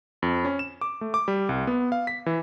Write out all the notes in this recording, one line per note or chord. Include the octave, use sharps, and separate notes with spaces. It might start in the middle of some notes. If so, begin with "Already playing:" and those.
F2
C#4
E7
D6
A3
D6
G3
C2
B3
F5
B6
E3